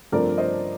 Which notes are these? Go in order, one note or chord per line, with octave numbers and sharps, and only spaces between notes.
G2 F3 A3 C4 A#4 D5
C5 D#5